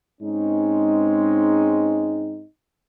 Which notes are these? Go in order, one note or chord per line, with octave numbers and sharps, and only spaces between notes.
G#2 G#3 C4 C#4 D#4